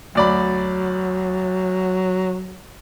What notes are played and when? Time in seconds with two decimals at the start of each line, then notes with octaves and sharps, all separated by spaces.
0.15 D2 F#3 D5 B5